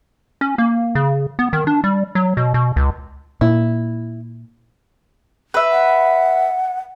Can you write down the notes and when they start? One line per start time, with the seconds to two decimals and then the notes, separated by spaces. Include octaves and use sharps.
0.41 C#4
0.58 A#3
0.95 C#3
1.39 B3
1.53 D#3
1.67 D4
1.84 G3
2.15 F#3
2.37 B2
2.54 B2
2.76 C#2
3.41 A#2 E4
5.54 B4 E5
5.72 F#5